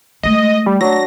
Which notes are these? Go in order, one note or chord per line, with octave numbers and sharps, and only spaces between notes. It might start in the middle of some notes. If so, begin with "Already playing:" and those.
G#3 A3 D#5
G3
F#3 D4 A#6